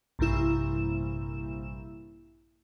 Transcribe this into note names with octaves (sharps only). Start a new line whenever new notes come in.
A#1 G2 C3 A#3 E4 E7